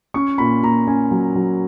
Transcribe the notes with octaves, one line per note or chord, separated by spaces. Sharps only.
C#4 C#6
A#2 B5
A#2 A#5
C#4 G#5
F#3
F#3